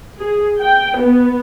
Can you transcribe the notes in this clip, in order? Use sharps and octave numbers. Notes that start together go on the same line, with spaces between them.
G#4
G5
B3